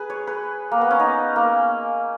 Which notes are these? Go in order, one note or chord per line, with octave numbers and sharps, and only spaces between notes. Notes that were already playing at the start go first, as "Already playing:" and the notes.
Already playing: G#4 B4
C#5
B4
A#3
B3
C#4
D#4
A#3